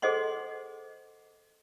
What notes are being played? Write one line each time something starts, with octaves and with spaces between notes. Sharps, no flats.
G#4 A4 C5 D#5 F#5 C6